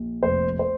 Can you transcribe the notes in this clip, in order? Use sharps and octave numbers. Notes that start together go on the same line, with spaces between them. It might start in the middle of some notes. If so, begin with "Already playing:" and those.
Already playing: A#1
F1 C5
C5